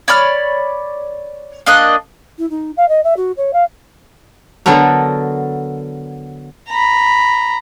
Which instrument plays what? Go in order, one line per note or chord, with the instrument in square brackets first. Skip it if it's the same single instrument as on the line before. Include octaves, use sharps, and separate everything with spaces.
[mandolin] C#5 D5 B5 F6
A#3 D4 D#5 F#6
[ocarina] E4
D#4
F5
D#5
E5
F#4
C#5
F5
[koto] D3 F#3 B3 A4 A#4
[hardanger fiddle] A#5 B5